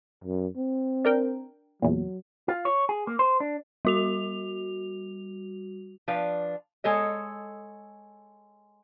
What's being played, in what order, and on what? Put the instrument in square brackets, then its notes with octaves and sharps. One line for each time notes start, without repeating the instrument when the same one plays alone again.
[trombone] F#2
C4
[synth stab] D4 A#4 G5
[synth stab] E2 A#2 [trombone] F#3
[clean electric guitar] F4
C#5
G#4
A#3
C5
D4
[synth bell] G3 F#4 F7
[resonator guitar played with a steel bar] F3 D4 B4 F5
G#3 A4 C#5 D#5